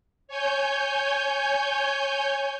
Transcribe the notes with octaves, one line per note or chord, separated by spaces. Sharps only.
C#5 G#5 G6